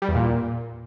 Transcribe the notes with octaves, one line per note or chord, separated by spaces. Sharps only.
G3
E2
A#2